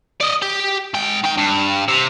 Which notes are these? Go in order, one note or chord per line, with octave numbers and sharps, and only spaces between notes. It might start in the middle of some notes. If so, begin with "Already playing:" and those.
D5 D#5
G4 G5
G#2 G5
D#3 G5
G2
C3